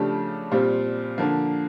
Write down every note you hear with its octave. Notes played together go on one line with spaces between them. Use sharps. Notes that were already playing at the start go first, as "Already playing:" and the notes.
Already playing: C#3 F3 A3 D4 G4
A#2 G3 C4 F4
D3 F3 A#3